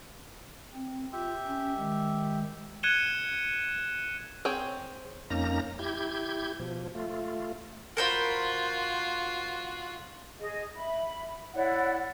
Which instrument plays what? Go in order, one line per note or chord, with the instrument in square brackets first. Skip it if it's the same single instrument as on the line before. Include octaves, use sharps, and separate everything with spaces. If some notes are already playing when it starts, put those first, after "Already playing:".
[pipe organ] C4
[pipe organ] F4 [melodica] G4 E5
[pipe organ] C#4
D#3 G#3
[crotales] F#6 G#6 C#7 D#7 E7 G7
[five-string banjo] C4 G#4 C#5 G5
[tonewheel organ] F2 A#3 C#4 D#4 A#5 A#6
E4 G4 G6 G#6
B2 F3
A3 F4
[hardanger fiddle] F4 F#4 [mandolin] A#4 C5 B5
[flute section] G#4 D#5
E5 B5
E4 C#5 D5 F#5